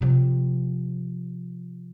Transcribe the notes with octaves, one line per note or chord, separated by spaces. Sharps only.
C3 F3